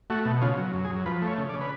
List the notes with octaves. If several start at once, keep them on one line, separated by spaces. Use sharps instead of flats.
A3 F#4
B2
C#3 F4
F#3
F#2
G#4
F#2
F3 B4
A3
C#5
C#3
D5
C#3
B4